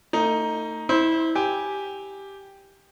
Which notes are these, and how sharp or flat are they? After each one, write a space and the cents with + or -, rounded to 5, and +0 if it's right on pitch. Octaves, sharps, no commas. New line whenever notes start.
A3 +40 D#4 +5
E4 -25 C5 +0
G4 +0 G#5 +0